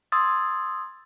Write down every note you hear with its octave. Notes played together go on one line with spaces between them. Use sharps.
C6 D#6 E6 G#6 A6